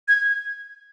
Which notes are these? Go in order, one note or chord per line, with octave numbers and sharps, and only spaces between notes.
G#6